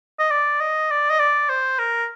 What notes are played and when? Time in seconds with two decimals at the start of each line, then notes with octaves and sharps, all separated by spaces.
0.19 D#5
0.31 D5
0.60 D#5
0.91 D5
1.10 D#5
1.19 D5
1.49 C5
1.79 A#4